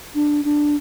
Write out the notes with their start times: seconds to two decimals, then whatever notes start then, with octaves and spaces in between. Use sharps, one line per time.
0.15 D4
0.45 D4